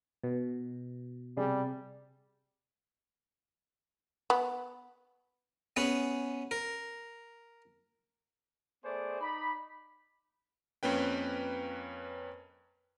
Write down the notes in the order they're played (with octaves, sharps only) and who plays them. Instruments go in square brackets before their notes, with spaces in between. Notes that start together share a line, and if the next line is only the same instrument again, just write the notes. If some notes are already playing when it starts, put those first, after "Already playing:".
[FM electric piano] B2
[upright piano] C3 G#4 D5 [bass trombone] G3
[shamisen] B3
[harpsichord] B3 C#4 G#4 B4
A#4
[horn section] A3 B3 G#4 C5 D5
D#4 D5 B5
[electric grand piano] F2 A#3 C#4 B4 G5